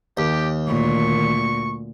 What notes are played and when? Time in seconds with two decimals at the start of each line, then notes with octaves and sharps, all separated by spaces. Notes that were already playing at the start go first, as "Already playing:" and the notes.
0.17 D#2 G4
0.68 D2 A#2 C#6